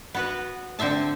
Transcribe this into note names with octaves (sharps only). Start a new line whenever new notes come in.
B3 F#4 B4
D3 C4 C5 E5 A5